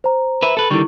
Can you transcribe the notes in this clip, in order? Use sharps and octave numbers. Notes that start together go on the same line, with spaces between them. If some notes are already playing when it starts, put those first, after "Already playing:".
C5 A#5
B4 E5
A4 B4
D3 D#3 G3 E4 C#6